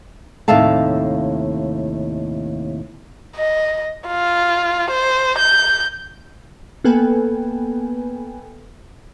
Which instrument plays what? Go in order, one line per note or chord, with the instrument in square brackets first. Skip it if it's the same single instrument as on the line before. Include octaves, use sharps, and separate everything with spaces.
[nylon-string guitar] D#2 A2 C3 E5 F5 A5
[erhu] D#5
F4
C5
G6
[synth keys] A#3 B3 A4 B4 G5 G#5